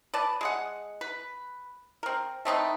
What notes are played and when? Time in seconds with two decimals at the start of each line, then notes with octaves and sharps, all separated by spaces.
0.14 B4 D5 A5
0.41 G#3 G#4 F#5
1.01 B4
2.03 C4 A#4
2.45 A3 C4 D#4 B4